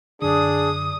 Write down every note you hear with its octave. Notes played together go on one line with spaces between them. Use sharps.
F#2 D3 D4 G#4 D#6